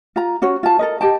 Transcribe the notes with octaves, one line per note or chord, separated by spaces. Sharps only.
F4 A#5
C#4 F#4 C#5
F4 A5
A4 A#4 D#5
G4 D#5 G5 A5